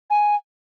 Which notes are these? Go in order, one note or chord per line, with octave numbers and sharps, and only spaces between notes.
G#5